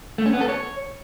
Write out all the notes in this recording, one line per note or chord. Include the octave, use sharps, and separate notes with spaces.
A3
C#4
B3
A4
C#5